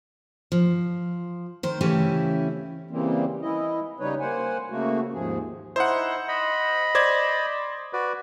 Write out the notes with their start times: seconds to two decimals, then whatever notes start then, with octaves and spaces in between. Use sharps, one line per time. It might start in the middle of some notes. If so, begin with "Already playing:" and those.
0.52 F3
1.63 D#3 C5
1.81 C#3 E3 A3 C#4 E4 G4
2.91 C#3 E3 G3 A#3 C4
3.42 E3 E4 D#5
4.00 C#3 G3 D#4 B4 C#5
4.20 A#3 C5 F#5 G#5
4.71 C#3 A3 A#3 F#4
5.14 D#2 G#2 F3 G#4
5.76 D#4 E4 C5 F#5
6.28 D#5 B5
6.95 C5 D5 G#6
7.93 F#4 B4 D5